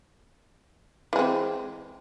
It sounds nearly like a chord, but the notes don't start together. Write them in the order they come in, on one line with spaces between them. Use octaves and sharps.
E3 G#3 C4